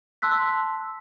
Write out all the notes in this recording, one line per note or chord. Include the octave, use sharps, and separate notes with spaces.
A5 C6 E6 F#6 B6